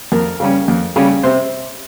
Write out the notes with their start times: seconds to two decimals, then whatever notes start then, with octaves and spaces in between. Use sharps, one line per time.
0.12 F2 A#4
0.40 C#3 G3 C#4
0.68 F2
0.96 C#3 G3 C#4
1.23 C3 C5